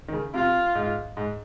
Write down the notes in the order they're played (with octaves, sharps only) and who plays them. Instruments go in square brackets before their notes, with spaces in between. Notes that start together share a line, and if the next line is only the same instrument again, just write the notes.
[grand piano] D#3
C#3
[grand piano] C3 [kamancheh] F4
[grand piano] G#2
G#2